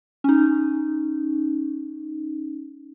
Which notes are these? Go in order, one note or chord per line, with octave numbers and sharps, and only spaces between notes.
C#4 D#4